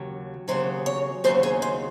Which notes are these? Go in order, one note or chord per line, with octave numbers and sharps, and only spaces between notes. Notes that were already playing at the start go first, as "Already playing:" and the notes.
Already playing: D#2 C#3 F#3
D#2 C#3 F#3 C5
C#5
D#2 C#3 F#3 C5
G#4
C5